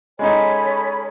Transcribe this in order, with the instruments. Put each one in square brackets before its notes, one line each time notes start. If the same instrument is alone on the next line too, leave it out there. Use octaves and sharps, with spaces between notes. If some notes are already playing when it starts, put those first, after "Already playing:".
[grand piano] G#3 C#4 D#4 [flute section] A4 G#5 B5 [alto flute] C#5